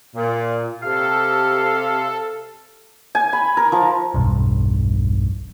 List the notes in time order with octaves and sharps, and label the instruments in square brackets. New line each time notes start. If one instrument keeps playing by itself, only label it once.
[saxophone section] A#2
[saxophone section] C3 G4 F5 [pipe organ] A4
[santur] G#5
B5
A#4
F3
[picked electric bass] E1 B1 G2